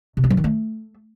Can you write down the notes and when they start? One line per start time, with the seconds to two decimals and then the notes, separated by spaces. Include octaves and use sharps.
0.17 C3
0.24 F4
0.30 F#3
0.37 D#3
0.44 A3